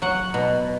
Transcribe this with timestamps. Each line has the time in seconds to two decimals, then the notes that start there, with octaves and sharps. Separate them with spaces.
0.02 F#3 F#5
0.34 B2